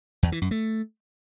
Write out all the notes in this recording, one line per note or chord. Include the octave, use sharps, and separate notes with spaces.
E2
E3
F#2
A3